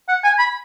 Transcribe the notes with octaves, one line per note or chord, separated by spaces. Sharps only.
F#5
G#5
B5